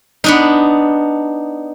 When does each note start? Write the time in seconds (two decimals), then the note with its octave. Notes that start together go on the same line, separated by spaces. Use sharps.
0.24 B3 D4 D#4